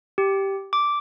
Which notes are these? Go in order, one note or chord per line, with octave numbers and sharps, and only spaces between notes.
G4
D6